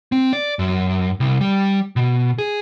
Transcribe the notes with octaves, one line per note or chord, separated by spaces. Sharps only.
C4
D5
F#2
C2
G3
B2
G#4